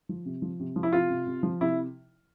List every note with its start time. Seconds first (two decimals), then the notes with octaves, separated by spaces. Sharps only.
0.09 F3
0.25 C3
0.42 F3
0.60 C3
0.76 F3
0.83 E4
0.93 C3 F4
1.10 C3
1.27 C3
1.43 F3
1.61 C3 E4